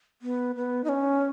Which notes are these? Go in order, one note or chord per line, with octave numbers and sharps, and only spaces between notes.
B3
B3
D#4
C#4